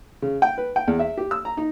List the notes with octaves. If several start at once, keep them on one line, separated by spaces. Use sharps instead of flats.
C#3
G5
B4
G5
E2
E5
G4
E6
A#5
D#4